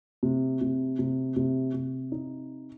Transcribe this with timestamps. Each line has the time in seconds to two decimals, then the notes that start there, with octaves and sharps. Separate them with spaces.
0.23 C3
0.61 C3
0.99 C3
1.36 C3
1.74 C3
2.12 D#4